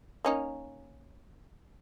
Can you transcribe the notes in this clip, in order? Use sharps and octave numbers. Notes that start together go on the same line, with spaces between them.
A#3 C#4 D#4